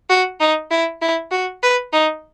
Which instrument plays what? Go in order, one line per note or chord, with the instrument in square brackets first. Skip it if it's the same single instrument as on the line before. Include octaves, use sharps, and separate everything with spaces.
[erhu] F#4
D#4
E4
E4
F#4
B4
D#4